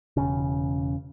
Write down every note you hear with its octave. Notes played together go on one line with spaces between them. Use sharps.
E1 C#3